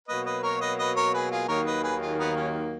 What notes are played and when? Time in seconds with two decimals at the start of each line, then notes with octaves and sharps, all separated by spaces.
0.08 B2 F#3 A#3 B4 D#5
0.26 B4 D#5
0.43 A#4 C#5
0.61 B4 D#5
0.79 B4 D#5
0.97 A#4 C#5
1.14 G#4 B4
1.31 F4 G#4
1.48 D#2 D#3 F#3 A#3 A#4 C#5
1.66 B4 D#5
1.83 G#4 B4
2.01 F4 G#4
2.19 B3 D#4
2.36 C#4